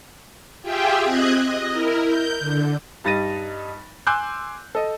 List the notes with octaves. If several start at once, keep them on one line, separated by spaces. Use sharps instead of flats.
F4 G4 G#4 E5 G5
C4 D#5 F#6 G#6
D#5
E4 A#4
G6
D3
G2 G3 D#4 A6 A#6 D#7
G#5 C6 D6 E6 F#6 G6
A4 D#5